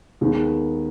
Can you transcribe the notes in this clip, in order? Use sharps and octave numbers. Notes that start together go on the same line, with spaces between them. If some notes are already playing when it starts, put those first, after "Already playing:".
D#2 D#3 G#3 B3